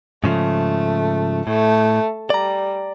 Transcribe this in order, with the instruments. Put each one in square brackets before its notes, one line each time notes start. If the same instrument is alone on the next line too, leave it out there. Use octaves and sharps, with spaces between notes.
[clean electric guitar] G#2 C#3 F3 [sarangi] A3
[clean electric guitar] A2 [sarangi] A3
[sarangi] G3 [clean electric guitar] D5 A#5